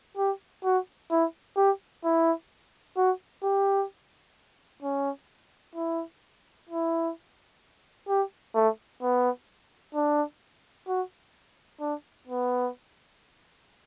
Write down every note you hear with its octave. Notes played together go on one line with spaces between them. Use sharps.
G4
F#4
E4
G4
E4
F#4
G4
C#4
E4
E4
G4
A3
B3
D4
F#4
D4
B3